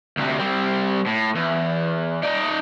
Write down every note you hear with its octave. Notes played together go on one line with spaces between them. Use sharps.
D2 C3
G3 C4
A2
E2
D#4 D5